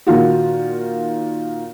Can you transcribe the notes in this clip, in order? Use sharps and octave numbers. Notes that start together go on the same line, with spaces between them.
A#2 D#3 F4 F#4